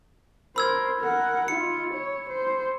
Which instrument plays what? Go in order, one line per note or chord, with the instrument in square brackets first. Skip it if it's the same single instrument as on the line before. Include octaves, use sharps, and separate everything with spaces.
[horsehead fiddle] A#4 C5 [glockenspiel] B5 E6 G#6
[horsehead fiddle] A#4 F#5
[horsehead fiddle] D#4 F4 [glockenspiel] C#7
[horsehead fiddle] C#5
C5